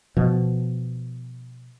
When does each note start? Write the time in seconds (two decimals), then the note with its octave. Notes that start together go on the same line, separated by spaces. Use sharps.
0.17 B2 F3